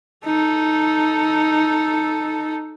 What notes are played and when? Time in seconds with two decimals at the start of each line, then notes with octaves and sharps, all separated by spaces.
0.25 D#4 A4